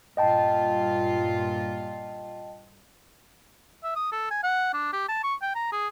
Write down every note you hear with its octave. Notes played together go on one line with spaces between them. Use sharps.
G2 A#2 F4 D#5 G5 A5
E5
D#6
A4
G#5
F#5
D4
G4
A5
C#6
G5
A#5
G#4